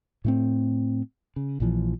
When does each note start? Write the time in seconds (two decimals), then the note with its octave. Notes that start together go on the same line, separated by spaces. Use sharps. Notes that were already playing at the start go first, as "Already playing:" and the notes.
0.25 A2 A3 C4
1.36 C#3
1.60 A#1 A#2 E3 F3